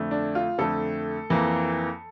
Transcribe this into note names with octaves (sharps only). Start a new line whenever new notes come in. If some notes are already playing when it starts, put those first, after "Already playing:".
Already playing: F2 D3 A3
D4
F4
F2 D3 A3 A4
F2 E3 A#3